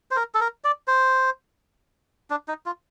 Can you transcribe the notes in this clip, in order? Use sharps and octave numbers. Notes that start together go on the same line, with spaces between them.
C5
A#4
A4
A#4
D5
C5
D4
D#4
F4